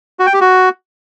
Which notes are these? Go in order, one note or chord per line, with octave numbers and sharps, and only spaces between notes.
F#4
G5
G4
F#4